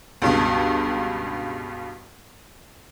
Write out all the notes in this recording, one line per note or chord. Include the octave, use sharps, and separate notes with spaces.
C#2 G2 B2